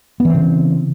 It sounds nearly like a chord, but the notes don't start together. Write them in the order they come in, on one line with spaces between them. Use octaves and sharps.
B3 E3 C4 C#3